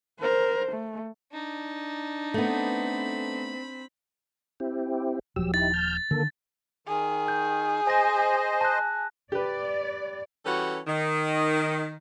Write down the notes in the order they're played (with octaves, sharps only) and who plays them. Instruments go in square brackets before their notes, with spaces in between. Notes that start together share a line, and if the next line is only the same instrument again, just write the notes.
[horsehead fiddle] A#4 C5
A3
[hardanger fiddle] D4 D#4
[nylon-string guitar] A3 B3 [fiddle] C4 B5
[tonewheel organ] C4 E4 G4
[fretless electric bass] D#1 F3 [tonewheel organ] F#3 G4 E6
[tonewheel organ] D#4 E4 G4 [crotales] A6
[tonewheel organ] A5 F6 G6
[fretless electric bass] D3 D#3 [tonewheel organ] A#3 A4
[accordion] D#3 [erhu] G#4
[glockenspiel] G6
[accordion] C5 D#5 [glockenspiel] G#5 A#6
[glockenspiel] A5 F#6
[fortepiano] G4 B4 [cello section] D5
[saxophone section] E3 G3 C#4 F#4 A4 B4
D#3